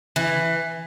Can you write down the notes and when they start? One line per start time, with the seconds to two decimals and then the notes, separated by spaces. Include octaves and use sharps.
0.16 E3